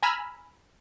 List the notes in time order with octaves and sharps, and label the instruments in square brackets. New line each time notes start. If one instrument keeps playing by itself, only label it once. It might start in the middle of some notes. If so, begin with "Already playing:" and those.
[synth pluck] G#5 A#5 B5 E6 F6